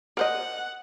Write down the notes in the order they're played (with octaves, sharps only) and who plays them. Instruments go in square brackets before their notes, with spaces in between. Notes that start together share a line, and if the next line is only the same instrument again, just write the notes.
[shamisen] A#4 C5 D#5 [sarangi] F#5